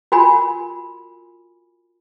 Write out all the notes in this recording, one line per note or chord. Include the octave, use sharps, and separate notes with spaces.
F4 F#4 A#4 G#5 B5